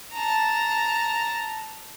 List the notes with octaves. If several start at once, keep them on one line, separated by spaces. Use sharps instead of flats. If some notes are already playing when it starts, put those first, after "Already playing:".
A5 A#5